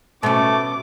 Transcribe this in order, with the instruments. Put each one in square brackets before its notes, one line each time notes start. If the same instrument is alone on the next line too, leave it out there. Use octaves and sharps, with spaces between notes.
[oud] B2 C#4 [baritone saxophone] A3 [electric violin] D6